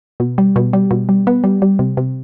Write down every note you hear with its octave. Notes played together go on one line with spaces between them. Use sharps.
B2
G3
B2
G3
B2
G3
B3
G3
G3
C3
C3